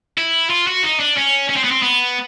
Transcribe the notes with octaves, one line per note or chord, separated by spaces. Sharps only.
E4
F4
F#4
D#4
D4
C#4
C#4
C4
B3
C4
B3